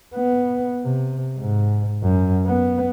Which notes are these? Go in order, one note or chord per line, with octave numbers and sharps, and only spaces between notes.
B3
C3
G#2
F#2
B3